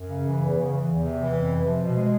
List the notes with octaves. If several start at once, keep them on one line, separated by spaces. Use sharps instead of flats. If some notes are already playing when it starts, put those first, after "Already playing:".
Already playing: F#2
C#3
E3
E2
C#3
E3
E2
C3
E3
F2
C3
F3
B2
G#3